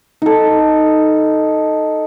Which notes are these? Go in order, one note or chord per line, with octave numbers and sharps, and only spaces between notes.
D#4 A4